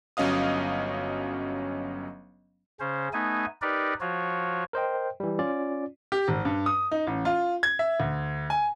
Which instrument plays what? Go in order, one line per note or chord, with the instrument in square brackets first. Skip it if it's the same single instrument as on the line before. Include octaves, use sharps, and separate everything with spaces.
[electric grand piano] G1 F#3 C#4 D#5 F5 D#6
[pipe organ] C#3 C#4 C5
A3 B3 D#4 G#5
D#4 G4 A#4 B4 D5
F3 F4 F#4 C#5
[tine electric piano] A#4 C5 D#5 G5
E3 G3
C#4 F4 D5
[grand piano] G4
G#1
G2
D#6
D#4
A1
F4
G#6
E5
D2
G#5